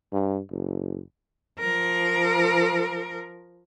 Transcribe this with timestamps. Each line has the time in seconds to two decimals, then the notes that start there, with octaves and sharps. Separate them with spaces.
0.12 G2
0.50 F#1
1.59 F3 A#4